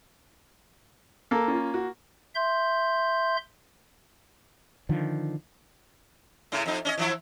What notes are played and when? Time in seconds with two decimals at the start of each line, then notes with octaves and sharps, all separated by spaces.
1.31 A#3 A4
1.48 C#4 F4
1.74 F#4
2.35 E5 C6 G6
4.89 D3 D#3 F3
6.52 A2 C#3 E4
6.66 F2 D#4
6.85 C#4 C#5 D#5
6.98 E3 F3 E4